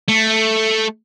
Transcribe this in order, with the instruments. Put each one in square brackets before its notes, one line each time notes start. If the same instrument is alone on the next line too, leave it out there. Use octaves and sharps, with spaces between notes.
[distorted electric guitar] A3